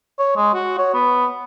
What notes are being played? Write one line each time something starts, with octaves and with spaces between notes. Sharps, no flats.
C#5
G#3
F#4
C#5
B3